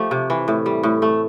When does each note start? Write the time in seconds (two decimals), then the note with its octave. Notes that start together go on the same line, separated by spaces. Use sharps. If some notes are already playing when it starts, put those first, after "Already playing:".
Already playing: F3 A3 G4
0.11 C3
0.30 E3
0.48 A2
0.66 G3
0.83 A2
1.02 A3